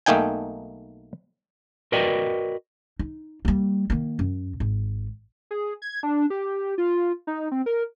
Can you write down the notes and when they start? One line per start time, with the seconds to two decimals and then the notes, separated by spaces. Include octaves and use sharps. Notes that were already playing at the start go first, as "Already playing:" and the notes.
0.06 B1 A3 A#3 D#4 G5 G#5
1.92 F#4 A#4 B4 D5 D#5 G5
2.99 D#4
3.45 G3 A#3
3.90 D#3 A#3
4.19 F#2
4.60 G#1
5.51 G#4
5.82 G#6
6.03 D4
6.30 G4
6.78 F4
7.27 D#4
7.52 C4
7.66 A#4